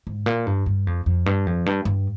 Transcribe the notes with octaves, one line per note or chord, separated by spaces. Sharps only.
G#2
A#2
G2
G2
F2
F2
G2
F2
G2
G2